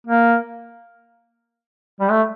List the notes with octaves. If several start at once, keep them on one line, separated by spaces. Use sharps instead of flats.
A#3
G3
A3